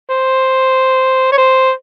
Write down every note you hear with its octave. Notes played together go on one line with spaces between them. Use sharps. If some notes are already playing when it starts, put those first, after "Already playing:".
C5
C#5
C5